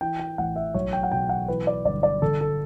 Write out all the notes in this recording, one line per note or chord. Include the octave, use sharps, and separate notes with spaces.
E3 G5
G5
A1 F#5
E5
B1 C#5
G5
F#5
B2 G5
F#5
E3 B4
D5
G1 D5
D5
D3 A4
A4